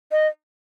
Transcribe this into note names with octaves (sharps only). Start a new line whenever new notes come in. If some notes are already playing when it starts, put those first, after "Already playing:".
D#5